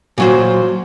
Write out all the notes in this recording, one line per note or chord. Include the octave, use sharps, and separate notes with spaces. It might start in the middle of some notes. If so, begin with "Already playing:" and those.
A#2 F#3 C5